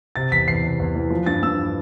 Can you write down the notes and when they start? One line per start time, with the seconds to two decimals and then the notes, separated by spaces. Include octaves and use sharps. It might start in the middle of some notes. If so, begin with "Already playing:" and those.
0.16 C3 A6
0.32 E2 B6
0.48 E2 C7
0.63 C3
0.80 E2
0.95 E3
1.10 F3
1.26 G2 A6
1.43 G2 E6